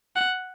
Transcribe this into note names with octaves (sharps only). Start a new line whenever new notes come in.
F#5